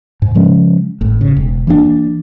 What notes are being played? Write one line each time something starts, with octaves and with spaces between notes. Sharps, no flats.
G#2
C#3 F3 G#3 C#4
G#1 A2
C#3
E1
E3 A#3 B3 D4